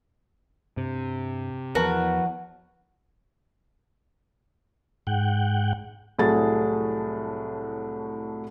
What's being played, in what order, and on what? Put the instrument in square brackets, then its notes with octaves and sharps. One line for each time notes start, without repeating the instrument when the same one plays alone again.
[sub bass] G2 [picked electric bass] C3
[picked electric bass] E2 [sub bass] F3 [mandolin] F#4 [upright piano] A#4 B4 A5
[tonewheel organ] G#2 F#5 G5
[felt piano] C2 A2 F#3 A3 G#4 A6